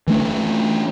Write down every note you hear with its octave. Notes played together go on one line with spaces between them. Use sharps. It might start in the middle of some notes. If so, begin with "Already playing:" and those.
E3 A3 D4